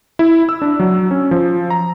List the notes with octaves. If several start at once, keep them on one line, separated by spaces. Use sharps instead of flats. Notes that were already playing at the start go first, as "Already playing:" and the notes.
E4
E6
D4
F#3
C#4
F3
A#5